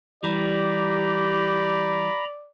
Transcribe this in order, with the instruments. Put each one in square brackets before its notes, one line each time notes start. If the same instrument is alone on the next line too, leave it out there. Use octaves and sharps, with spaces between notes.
[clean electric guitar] E3 G3 [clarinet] G4 [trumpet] D5 [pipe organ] A#5 B5